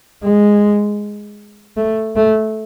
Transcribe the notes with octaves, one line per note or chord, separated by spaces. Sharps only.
G#3
A3
A3